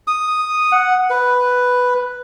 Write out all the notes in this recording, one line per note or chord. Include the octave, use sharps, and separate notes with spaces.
D#6
F#5
B4